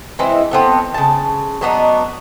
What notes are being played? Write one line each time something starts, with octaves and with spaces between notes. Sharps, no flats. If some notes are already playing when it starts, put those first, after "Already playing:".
E3 G#3 C4 E4
A3 B3 C4
C#3 A5
F#3 B3 D4 D#4